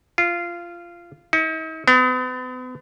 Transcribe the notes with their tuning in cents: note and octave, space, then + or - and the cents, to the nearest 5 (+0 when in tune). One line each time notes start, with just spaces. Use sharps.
F4 -15
D#4 +45
B3 +40